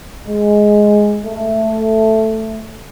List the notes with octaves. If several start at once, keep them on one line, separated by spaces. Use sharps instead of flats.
G#3
A3